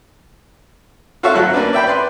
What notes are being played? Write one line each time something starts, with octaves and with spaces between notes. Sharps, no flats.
F4 F#4 A4 C#5 E5 F5
G#1 F#3 F#6
A#3 C#4 D4 B4
D5 E5 G5 B5
B4 D5 C6